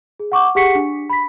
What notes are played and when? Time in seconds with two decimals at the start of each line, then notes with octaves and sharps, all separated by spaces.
0.20 G#4
0.32 F#5 C#6 D6
0.55 G4 G#4 F#5 C#6 B6 C#7
0.75 D4
1.10 B5 B6